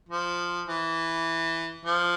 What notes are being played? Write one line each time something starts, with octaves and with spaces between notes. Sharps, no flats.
F3
E3
F3